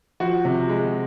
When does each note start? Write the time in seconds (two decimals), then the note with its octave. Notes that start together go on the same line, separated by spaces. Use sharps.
0.20 F3 F#4
0.45 C3
0.69 G#3